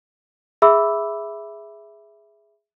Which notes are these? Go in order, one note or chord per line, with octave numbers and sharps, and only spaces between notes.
G#4 E5 B5 D6 E6